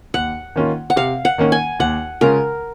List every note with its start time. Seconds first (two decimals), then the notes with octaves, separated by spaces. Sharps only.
0.14 D#2 F#5
0.56 D#3 A#3 C#4 F4
0.90 F#5
0.96 C3 F5
1.25 F#5
1.38 D#3 A#3 C#4
1.52 G#5
1.79 D#2 F#5
2.21 C#3 G#3 C#4 F4 A#4